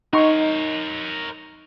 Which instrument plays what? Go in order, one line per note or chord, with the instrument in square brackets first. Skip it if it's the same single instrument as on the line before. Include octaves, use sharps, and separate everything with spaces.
[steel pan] D#4 C6 C#6 [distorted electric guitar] A#4 C#5